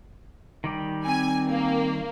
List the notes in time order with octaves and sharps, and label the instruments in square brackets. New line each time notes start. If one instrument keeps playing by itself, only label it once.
[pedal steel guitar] D#3 G3 G4
[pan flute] C4 [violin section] G#5
[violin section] A#3